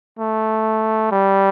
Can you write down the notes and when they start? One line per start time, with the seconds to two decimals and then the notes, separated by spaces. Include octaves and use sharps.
0.19 A3
1.11 G3